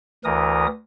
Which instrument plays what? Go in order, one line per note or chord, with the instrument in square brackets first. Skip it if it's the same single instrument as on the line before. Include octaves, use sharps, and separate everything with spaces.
[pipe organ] D2 E3 A#4 D#6